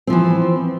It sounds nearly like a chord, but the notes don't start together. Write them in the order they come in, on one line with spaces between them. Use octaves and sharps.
C4 F3 E3